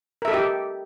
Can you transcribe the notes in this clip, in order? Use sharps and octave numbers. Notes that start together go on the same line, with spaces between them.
G4 A4 A#4 D#5 E5